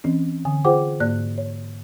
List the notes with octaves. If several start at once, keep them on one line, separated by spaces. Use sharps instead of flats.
E3 C4 C#4
D3 G#5
F4 G#4 C5 F#5 G5 D6
G#2 A#3 D5 F#6
C#5